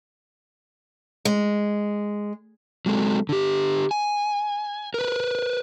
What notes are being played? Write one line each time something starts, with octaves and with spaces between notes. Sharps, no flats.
G#3
F#3 G#3 C4 A4
D3 G4
G#5
A#4 B4